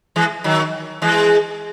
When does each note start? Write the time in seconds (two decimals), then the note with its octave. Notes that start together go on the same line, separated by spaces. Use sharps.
0.16 E3 G#3
0.44 D#3 F#3
1.02 E3 G#3